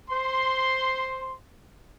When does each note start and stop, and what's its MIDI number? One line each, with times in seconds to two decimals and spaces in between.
0.10 1.32 72
0.10 1.32 84